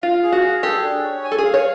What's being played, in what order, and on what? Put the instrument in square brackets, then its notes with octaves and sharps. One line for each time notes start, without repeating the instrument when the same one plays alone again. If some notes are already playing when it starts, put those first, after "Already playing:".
[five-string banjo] F4 [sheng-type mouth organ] F5
[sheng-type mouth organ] G#4
[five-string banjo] F#4
[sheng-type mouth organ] G#4
[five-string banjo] G4 [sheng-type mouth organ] A4
[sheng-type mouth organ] D4
C#5
G#5
[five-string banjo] A4
G#4
[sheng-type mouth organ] F5
[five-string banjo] C#5